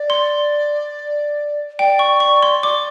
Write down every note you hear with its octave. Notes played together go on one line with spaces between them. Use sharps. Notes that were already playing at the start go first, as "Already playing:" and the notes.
Already playing: D5
C6
D5 G5
C#6
C#6
C6
D5 D6